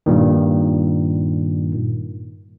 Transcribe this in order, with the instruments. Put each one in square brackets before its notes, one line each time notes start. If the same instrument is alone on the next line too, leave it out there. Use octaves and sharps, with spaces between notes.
[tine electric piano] G2 A#2 D#3